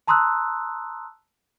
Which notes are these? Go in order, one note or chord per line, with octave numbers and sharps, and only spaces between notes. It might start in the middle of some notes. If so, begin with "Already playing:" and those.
A5 A#5 C6 D#6 E6 F#6